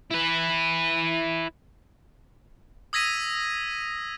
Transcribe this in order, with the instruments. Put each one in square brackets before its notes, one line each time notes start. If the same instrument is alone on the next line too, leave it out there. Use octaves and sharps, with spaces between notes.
[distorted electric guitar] E4 B4
[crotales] D#6 E6 G#6 A#6 B6 D#7